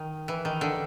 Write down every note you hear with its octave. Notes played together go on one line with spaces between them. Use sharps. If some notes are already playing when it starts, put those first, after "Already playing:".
Already playing: D#3
E3
D#3
D3